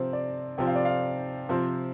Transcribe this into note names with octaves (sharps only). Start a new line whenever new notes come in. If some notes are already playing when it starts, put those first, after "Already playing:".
Already playing: C3 F3 C4 C5
D5
C3 F3 C4 G5
F5
D5
F5
C3 F3 C4 C5